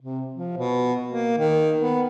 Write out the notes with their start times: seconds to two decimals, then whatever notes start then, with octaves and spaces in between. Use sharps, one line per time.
0.02 C3
0.34 F3
0.57 B2
1.08 A#3
1.38 D#3
1.78 B3